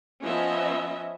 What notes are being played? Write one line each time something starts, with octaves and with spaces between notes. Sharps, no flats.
F3 B3 C#4 D#5 E5